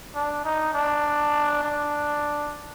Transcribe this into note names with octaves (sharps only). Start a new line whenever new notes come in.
D4
D#4
D4
D4